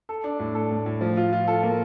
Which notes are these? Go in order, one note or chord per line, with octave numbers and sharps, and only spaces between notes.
A4
D4
A2
A4
A2
A2
F3
F4
F4
A4
A#3